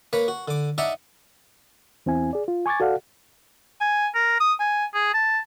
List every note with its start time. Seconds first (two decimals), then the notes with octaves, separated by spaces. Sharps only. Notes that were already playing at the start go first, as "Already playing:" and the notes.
0.13 A#3 B4 C#5 A#5 B5
0.28 F#4
0.48 D3 D6
0.78 D4 D#4 D5 E5 F#5 A#5
2.06 E2 C4 E4 G#5
2.33 G#4 D5
2.48 F4
2.66 G#5 C#6 D6 G#6 A6
2.80 F#4 A4 D5 F5 F#5
3.81 G#5
4.15 A#4
4.40 D#6
4.60 G#5
4.94 G#4
5.14 A5